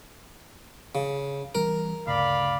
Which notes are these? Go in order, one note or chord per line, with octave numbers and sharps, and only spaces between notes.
C#3
E3 G3 C4 A#4
D2 G2 C#3 D5 F5 B5